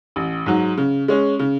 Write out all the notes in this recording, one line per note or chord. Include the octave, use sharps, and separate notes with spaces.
A1
G#2 F#3
C#3
G#3 C#4
C#3